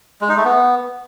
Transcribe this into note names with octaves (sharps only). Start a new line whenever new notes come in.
G#3
D#4
A3
B3